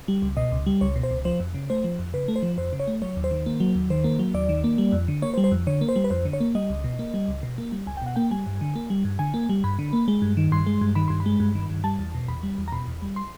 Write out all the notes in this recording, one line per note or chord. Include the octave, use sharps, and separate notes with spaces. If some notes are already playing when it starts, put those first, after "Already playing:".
G3
C#2
B2 D#5
C#2
G3
C#2 C#5
B2
C5
C#2
F3 C5
F2
C#3
A3 C5
F3
F2
C#3 B4
A3
C5
F3
F2 C5
C#3
C#5
A3
F#3 C#5
D#2
C5
D#3
A#3
F#3
D#2
D#3 C5
A#3
F#3
D#2 D5
D#3
A#3
G3
F2
D3
A#3 C#5
C5
G3
C5
F2
D3 C#5
A#3
C5
G3
B4
F2 C5
D3
C#5
A#3
G3 D#5
C#2
B2
A#3
G3
C#2
B2
A#3
G3
C#2 G#5
G5
B2 F#5
A#3 G5
G3 G#5
G2
D3
A#3
G3
G2
D3 G#5
A#3
G3
G2 B5
D3
A#3
G#3
G2
D#3
G2 C6
G#3
G2
D#3 B5
G2 C6
B5
G#3
G2
D#3
G2
G3 A5
E2
B2
E2 B5
G3
E2
A#5
B2 B5
E2
G3
C6